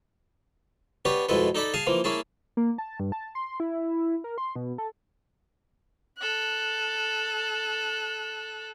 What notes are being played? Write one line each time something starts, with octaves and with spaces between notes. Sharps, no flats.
B3 C#4 D4 G4 B4 C#5
F2 B2 G#3 E4 A4 B4
D#4 A4 D5 A5 B5
G#4 F5 G#5 A5
E3 F3 A#3
A#3 C#4 E4 G#4 A5
A#3
A5
G2
A5
C6
E4
A#4
C6
B2
A4
A4 F#6